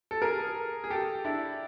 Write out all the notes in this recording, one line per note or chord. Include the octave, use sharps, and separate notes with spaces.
A4
G#4 A#4
G#4
G4 A4
D4 E4